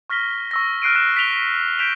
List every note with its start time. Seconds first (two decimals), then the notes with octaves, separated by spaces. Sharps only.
0.10 C#6 F6 A#6 B6 G7
0.51 C#6 E6 A#6
0.82 F6 F#6 C7 D7 D#7
0.95 F#6 A#6 E7
1.17 B6 D7 F7 G7
1.79 G6 B6 D7 E7 F7